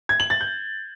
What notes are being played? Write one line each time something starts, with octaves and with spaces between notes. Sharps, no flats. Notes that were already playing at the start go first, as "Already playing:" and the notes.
G#6
F#7
A6
G6